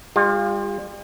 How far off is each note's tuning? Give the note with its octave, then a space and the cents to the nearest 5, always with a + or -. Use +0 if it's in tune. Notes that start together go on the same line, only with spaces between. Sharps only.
G3 +40 F4 +5